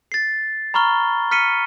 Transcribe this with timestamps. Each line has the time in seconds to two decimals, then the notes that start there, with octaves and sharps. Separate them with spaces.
0.12 A6 C7
0.74 A#5 B5 C#6 F6 G7
1.31 F6 B6 C#7 D#7 G7